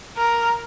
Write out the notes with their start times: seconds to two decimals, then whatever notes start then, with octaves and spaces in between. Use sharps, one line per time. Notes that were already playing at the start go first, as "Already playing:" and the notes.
0.17 A#4